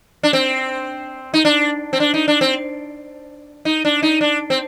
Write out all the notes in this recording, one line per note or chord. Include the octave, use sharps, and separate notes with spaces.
D4
C4
D#4
D4
C4
D4
D#4
D4
C4
D#4
D4
D#4
D4
C4